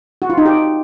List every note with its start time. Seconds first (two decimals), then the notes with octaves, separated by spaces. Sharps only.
0.22 F#4
0.30 F4
0.38 D#4
0.46 G4